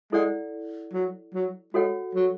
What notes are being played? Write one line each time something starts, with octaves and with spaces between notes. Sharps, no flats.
G#3 E4 A4 D5 F#5
F#3
F#3
G#3 F#4 A4 C#5 F#5
F#3